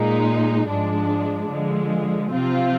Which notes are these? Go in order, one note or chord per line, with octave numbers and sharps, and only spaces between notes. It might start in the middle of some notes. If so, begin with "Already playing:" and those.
Already playing: A#2 G#3 D#4
G#2 F3 G#3 D4
D3 F3 G#3
C3 F3 C4 F4